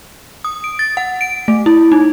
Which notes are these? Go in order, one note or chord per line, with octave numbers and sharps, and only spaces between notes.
D#6
D7
A6
F#5
D7
A3
E4
D#4